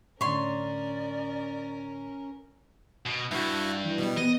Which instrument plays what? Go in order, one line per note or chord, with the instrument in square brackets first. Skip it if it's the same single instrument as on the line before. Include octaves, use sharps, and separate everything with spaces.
[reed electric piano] A2 D3 [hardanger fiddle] C#4 A#4 [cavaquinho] C#5 C6 [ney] D5
[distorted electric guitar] B2
[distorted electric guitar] G2 [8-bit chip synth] E4 F#4
[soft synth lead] E3
[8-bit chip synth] B2 G3
[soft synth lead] B3 [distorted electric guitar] D#5 [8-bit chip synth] A#6